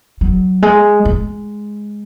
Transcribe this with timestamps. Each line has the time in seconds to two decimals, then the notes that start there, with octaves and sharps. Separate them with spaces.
0.21 F#3
0.62 G#3
1.05 G#3